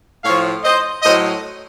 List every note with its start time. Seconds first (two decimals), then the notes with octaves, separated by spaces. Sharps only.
0.24 A2 F3 C#5 F5
0.64 C5 D#5
1.03 A2 F#3 C5 D#5